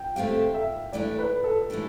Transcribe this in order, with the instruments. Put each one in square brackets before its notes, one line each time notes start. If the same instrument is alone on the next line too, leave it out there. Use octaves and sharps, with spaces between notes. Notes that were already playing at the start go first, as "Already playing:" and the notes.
Already playing: [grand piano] G5
[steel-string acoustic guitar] D3 A3 C4 G4 [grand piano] F5
[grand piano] E5
[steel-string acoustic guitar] E3 A3 D4 G4 [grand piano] D5
[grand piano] B4
A4
[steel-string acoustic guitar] E3 A3 D4 G4